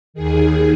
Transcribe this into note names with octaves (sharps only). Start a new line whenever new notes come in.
D#2 D#3 G#4